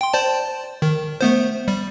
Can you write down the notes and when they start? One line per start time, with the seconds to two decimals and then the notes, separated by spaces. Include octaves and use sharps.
0.01 G5 C6
0.13 C5 D5 A5
0.82 D#3
1.21 A3 B3 C5
1.68 G3